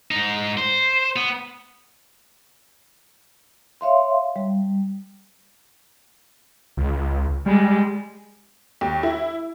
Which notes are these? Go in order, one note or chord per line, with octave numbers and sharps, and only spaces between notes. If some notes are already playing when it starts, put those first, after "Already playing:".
G#2 D#4
C5
B3
C#5 E5 F5 C6
G3
C#2
G3 G#3
D#2
E4